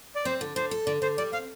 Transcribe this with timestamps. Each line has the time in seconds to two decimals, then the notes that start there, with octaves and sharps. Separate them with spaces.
0.16 D5
0.25 C4 C5
0.41 D3
0.56 D3 C5
0.71 A4
0.87 D3 D5
1.02 D3 C5
1.18 G3 D5
1.33 C4 F5